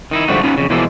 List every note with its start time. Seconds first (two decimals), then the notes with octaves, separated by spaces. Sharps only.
0.11 D#3 D#4 E4
0.28 G#2 D3 F3 G3 A3 F#4
0.43 B3 C#4 D#4 F4
0.57 F2 C#3
0.70 B2 E3 F3 G#3 A#3 A4